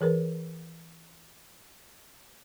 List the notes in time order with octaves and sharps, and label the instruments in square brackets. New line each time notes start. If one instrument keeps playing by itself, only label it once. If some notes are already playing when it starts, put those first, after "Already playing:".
[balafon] E3 G#4 A#4 B4